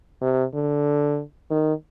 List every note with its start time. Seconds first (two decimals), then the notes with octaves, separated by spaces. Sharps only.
0.22 C3
0.54 D3
1.51 D#3